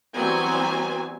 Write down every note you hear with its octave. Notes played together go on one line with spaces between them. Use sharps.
E3 F#3 G3 B3 C4 G#5